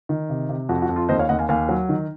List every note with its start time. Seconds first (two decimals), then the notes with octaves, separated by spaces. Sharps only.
0.09 D#3
0.30 C3
0.49 C3
0.69 F2 F#4
0.82 F#4
0.89 F2
0.96 F4
1.09 D#2 C5 D#5
1.19 C#5 F5
1.29 D#2 D#5 F#5
1.39 F5 G#5
1.49 D#2 F5 G#5
1.69 F#3
1.89 D#3